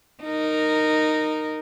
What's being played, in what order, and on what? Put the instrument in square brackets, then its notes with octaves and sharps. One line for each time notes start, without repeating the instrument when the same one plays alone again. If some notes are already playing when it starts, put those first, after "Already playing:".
[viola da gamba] D#4 A#4